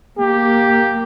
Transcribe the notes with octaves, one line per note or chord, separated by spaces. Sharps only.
A#3 G4